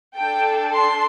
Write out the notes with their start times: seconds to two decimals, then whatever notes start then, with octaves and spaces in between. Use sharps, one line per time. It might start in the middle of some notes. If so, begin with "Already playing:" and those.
0.16 D4 A4 G5
0.72 C6